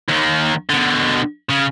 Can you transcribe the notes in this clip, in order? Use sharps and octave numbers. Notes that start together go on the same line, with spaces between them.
D#2 D#3
B2 D3
C#3